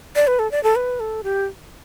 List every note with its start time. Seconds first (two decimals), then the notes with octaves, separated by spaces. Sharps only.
0.16 D5
0.27 B4
0.39 A4
0.51 D5
0.63 A4
0.76 B4
1.00 A4
1.24 G4